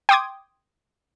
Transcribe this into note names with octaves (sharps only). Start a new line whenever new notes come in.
G5 C6 D6 D#6 G#6